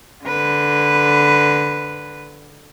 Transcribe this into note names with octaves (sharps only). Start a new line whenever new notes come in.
D3 B4